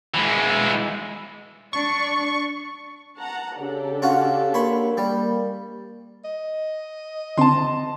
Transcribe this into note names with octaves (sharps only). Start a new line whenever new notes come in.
E3 G#3
D4 D5 C#6
F#5 A5 A#5
C#3 D4 G4 A4
C#4 F4 F#4
A#3 C#5 B5 C6
G3 A#3
D#5
D3 C4 A5 C6